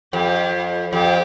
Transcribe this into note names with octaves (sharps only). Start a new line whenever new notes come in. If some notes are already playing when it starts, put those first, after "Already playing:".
F2 G4
F2 G4